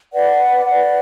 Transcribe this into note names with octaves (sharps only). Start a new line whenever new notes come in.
B4 D5 F#5
B4 D5 F#5